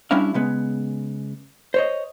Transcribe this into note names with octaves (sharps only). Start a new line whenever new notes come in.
G3 C#4 D4 E4 F5
C#3 G#3 B3
C5 C#5 D#5